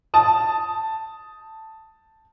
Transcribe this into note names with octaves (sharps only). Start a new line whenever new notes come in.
A5 D#6